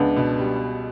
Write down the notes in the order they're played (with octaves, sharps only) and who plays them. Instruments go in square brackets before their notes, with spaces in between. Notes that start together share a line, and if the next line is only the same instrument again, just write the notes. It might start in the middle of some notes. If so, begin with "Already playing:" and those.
Already playing: [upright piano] C#2 [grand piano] B3 D4
[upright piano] B2
G3